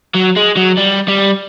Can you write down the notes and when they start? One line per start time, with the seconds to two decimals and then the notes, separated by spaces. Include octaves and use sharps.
0.15 F#3
0.36 G#3
0.56 F#3
0.77 G3
1.08 G3